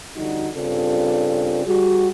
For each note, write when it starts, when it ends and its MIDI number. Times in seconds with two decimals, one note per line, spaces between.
0.15 0.46 41
0.15 0.46 50
0.15 0.46 55
0.15 0.46 63
0.15 0.46 66
0.54 1.64 43
0.54 1.64 49
0.54 1.64 60
0.54 1.64 65
0.54 1.64 69
0.54 1.64 74
1.65 2.07 55
1.65 2.07 66
1.65 2.07 68